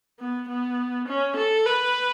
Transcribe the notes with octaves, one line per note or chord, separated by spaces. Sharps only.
B3
B3
C#4
A4
B4